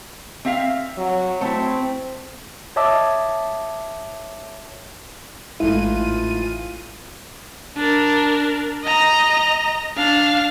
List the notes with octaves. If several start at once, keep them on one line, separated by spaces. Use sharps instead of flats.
C4 E5 F5
F#3
A3 C4 E4
C#5 D#5 E5 A5 D6 E6
A1 G#2 E3 A3 E4 F4 D#7
D4 A#4
D#5 A#5
D4 F5